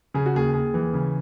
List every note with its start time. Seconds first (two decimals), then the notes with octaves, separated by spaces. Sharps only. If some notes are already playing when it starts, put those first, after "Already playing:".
0.14 C#3 G#4
0.26 F#4
0.35 D#2 G#4
0.53 D#2 G#4
0.74 E3
0.94 C#3